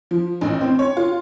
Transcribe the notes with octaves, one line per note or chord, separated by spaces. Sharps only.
F3
A1
C4
C#5
F4